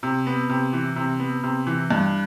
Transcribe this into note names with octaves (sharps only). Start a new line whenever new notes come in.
C3
B3
C3
E3
C3
B3
C3
E3
G2